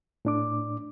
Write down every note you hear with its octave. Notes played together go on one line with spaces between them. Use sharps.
A2 D4 D6